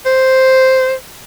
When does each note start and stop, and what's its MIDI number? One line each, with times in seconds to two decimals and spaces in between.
0.06 0.94 72